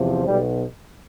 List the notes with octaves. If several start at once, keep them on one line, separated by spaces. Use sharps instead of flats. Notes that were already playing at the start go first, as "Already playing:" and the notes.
Already playing: E2 C3 F3
B1 B2 G3